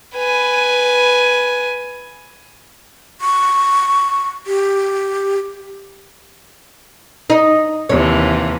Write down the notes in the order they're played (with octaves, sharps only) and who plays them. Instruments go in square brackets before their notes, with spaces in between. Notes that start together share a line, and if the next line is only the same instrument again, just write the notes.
[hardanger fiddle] B4 G#5
[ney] C#6
G4
[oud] D#4
[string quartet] D#2 C3 E3 [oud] C#5